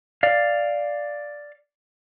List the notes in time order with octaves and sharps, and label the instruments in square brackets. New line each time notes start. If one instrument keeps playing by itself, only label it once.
[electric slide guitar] D5 F5